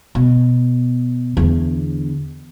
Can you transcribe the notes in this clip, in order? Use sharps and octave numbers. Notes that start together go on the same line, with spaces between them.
B2
E2 D3